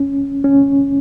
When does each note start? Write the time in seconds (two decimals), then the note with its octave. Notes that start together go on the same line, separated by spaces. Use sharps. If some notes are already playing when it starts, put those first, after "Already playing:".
Already playing: C#4
0.44 C#4